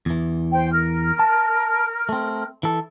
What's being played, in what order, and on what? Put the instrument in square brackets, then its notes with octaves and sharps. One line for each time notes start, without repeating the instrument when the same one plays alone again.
[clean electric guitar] E2 E3
[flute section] C5 G5
A#4 F6
[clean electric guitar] A5
A3 C4
E3 A4